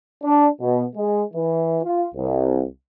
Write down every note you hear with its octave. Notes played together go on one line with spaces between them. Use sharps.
D4
B2
G#3
E3
F4
C2